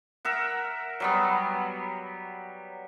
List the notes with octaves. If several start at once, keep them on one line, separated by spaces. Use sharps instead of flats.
A#4 E5 F#5
F#3 G3 B3